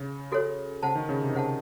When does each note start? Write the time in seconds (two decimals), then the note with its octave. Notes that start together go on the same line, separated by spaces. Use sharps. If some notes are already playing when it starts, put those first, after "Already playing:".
Already playing: C#3
0.32 F#4 A4 C#5
0.83 C#3 C5 F#5 A5
0.95 D#3
1.09 C#3
1.22 C3
1.29 D#3
1.34 C#3 C5 F#5 A5